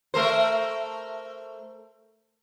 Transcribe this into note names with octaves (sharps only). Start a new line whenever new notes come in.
A3 A#4 C5